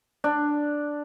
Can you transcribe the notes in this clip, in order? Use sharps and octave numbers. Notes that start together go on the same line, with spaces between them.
D4